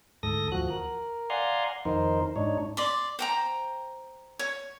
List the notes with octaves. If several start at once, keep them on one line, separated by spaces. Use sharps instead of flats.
D2 G#2 A4 D#6 A#6
D#2 F3 F#4 F#6
A#4
D5 F5 F#5 G#5 A#5 C6
F2 D#3 D#4 A#4 C5
G#2 D4 D#4 C#5
D5 C6
C5 G5 A#5
C#5